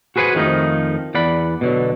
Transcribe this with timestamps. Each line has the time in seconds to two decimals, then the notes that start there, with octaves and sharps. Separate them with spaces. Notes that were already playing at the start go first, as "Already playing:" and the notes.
0.16 F#4 G#4 B4 C5 F#5 G#5
0.35 F2 D#3 F3 A3 D#4
1.14 E2 D5 F#5 B5
1.61 B2 D3 F#3